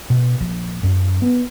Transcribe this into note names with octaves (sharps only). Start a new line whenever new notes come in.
B2
A#1
F#2
B3